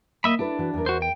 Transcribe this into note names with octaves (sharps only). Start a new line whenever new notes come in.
A#3 D#5 E5 B5
D4 E4 A4 B4
E3 F#4
E2 A#4
F#4 C5
G5